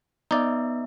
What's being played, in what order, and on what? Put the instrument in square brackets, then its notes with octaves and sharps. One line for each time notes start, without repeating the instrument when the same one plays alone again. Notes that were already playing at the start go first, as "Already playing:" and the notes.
[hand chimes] B3 E5 [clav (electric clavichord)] D#4 D5